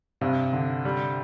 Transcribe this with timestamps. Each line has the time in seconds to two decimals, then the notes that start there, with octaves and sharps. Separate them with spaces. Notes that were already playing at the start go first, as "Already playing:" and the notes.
0.21 G2 C3
0.53 D3
0.85 G3